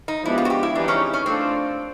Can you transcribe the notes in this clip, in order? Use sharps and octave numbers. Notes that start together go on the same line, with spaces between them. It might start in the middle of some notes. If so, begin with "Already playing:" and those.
D#4
F3 G#3 B3 D4 E4 G4
F4
F#4
G4
E4
E3 G3 C4 D4 D#4 G#4
C#4
C#4
A3 C4 D4 F4 A4